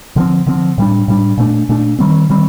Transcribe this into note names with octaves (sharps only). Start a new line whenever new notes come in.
D3 F3 C4
D3 F3 C4
A2 G3 D4
A2 G3 D4
A#2 A3 D4
A#2 A3 D4
D#3 G3 C4
D#3 G3 C4